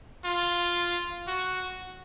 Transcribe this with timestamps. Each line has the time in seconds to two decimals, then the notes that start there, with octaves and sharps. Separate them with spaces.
0.25 F4
1.27 F#4